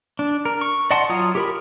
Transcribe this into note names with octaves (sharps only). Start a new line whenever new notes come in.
D4
A#4
C#6
D5 D#5 F#5 A5 C6
F#3 F4 C#5 A#5 D#6
G4 A#4 B5